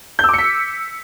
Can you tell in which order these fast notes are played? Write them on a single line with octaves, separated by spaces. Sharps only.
G6 E6 D6 C#7 B6